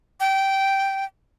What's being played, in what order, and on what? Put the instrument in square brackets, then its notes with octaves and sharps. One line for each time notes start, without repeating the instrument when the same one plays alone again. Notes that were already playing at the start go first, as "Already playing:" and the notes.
[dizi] G5